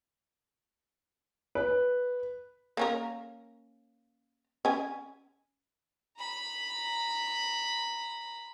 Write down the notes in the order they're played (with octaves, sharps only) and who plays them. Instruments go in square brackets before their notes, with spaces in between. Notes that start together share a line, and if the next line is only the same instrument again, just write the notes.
[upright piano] B4
[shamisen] A#3 C#4 A#4
C#4 G#5
[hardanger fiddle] A#5 B5